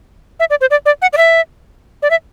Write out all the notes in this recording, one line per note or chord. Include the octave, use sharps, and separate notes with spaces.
E5
D5
C5
D5
D5
F#5
D5
E5
D5
E5